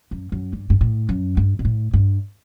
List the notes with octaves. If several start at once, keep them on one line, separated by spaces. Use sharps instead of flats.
F#2
F#2
G2
G2
A2
F#2
G2
B2
A2
G2